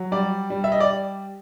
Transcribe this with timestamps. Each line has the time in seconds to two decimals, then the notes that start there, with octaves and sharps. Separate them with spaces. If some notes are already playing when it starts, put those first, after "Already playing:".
Already playing: F#3
0.12 G3 D5
0.50 G3
0.64 E5
0.72 D#5
0.80 D5